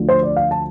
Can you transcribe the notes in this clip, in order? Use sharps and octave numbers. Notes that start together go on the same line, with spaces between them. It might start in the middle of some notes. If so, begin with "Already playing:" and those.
Already playing: D2 D3 F3
C5
D5
F5
A5